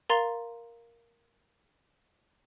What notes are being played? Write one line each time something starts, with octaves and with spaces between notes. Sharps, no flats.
A#4 F5 A#5 C6 A6